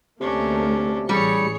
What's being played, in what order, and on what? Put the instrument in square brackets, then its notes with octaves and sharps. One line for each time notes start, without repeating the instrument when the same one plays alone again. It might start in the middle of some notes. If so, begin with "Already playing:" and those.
[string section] D2 A3 A#3 [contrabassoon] C3 [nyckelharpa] C#4 D4
[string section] A1 E3 C#7 [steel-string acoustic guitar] G3 [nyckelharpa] G#4 C#5